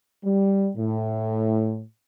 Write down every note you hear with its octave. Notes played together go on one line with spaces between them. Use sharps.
G3
A2